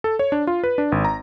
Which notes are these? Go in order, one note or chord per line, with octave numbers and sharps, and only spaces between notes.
A4
C#5
D4
F4
B4
D4
G#1
A#5